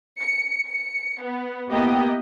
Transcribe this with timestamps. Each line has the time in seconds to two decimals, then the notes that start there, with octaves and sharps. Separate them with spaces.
0.21 C#7
0.66 C#7
1.22 B3
1.71 A#3 B3 E4 G4 D#5 G5